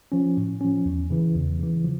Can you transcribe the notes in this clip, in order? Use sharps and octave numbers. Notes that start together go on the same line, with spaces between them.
F3 C#4
A2
F3 C#4
E2
C#3 E3
E2
C#3 E3
F3